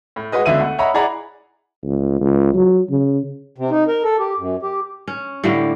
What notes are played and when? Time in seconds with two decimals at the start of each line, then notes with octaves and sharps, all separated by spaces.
0.16 A2
0.32 G#3 F#4 B4 D#5
0.45 C#2 B2 D3 E5 D#7 F#7
0.61 A3 F#5
0.79 C#5 D#5 E5 F#5 A#5 B5
0.94 E4 G#4 D5 F#5 A#5 B5
1.83 C#2
2.21 C#2
2.54 F#3
2.90 C#3
3.58 C3
3.71 D#4
3.88 A#4
4.04 A4
4.19 G4
4.38 F#2
4.63 G4
5.08 C#4
5.44 A2 D3 G3 A#3